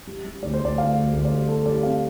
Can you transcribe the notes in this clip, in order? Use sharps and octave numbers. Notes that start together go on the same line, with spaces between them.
G3
G3
D2 D5
C5
D2 D5
D2 F5
D2
D2
D5
G3
G3 A4
G3 D5
C4 F5